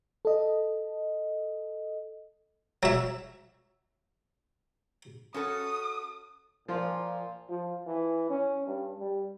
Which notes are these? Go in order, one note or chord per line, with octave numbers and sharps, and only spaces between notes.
A4 D#5
F#3 E5
C#4 F#4 A4 D#6
A#2 F3 F4
F3
E3
C#4
G2
G3